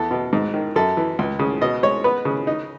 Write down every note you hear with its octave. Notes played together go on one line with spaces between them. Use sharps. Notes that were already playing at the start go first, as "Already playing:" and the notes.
Already playing: E2 A4
B2
G#2
D#3
F#2 A4
E3
C#2
C#3
B2 D#5
G#3 C#5
B3 B4
C#3
D#4